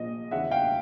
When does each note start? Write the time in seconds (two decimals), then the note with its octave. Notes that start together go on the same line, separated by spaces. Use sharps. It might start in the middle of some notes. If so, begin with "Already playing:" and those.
Already playing: A#1 A#2 F3 D#5
0.31 E2 C#3 E3 E5 F#5
0.51 F5 G5